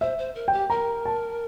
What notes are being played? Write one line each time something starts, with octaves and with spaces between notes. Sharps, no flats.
C5 E5
C5
A#4
G4 G5
A#4 A#5
A5